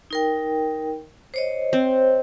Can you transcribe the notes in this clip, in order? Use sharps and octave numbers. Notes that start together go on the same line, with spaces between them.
D#4 A#4 G5
C5 C#5 D#5
C4